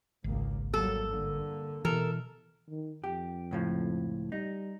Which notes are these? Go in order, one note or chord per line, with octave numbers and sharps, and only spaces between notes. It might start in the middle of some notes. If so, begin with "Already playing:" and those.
G#1 C#2 A#3
F#3 G3 A#3 A4
G2 D3 A#3
B2 E3 A4 A#4
D#3
F2 G4
C#2 A2 F3
G3 D#4